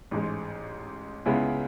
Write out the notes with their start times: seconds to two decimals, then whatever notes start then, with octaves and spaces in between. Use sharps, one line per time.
0.11 A1 G#2 G#3
1.26 C#2 C#3 G#3 B3 E4